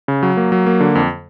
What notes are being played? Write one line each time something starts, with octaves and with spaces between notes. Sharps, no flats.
C#3
F#3
A#3
F#3
A#3
D3
F2